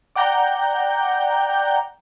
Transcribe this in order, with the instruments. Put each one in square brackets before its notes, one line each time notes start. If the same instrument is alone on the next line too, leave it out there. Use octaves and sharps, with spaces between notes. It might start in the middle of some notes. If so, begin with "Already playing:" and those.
[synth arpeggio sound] D5 F#5 G5 A#5 G6